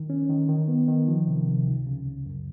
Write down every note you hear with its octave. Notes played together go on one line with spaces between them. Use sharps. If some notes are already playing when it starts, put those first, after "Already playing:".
Already playing: D#3
C#4
D#3
D#3
B3
D#3
F3
C3
C3
C#2
C#3
C#2
F#2